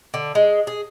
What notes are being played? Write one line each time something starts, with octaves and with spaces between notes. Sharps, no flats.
D3
G#3
G#4